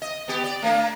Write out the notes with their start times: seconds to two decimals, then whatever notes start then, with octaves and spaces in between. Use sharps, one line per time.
0.02 D#5
0.28 B3 G4
0.44 D5
0.62 A3 A#3 D4